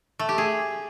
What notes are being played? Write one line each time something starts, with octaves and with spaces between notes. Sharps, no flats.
A3
G4
G#4